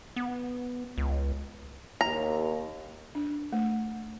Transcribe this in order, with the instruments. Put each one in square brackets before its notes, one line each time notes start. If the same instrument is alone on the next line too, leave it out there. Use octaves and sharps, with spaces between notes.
[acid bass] B3
C#2
[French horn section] D#2 [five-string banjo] A#5
[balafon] D4
A3